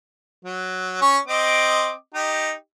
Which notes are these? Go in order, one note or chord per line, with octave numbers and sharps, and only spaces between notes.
F#3
C#4 C#6
C4 D#5 D6
D#4 G4